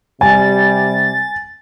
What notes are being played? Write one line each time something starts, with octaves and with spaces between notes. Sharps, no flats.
C3 G3 G#5 A6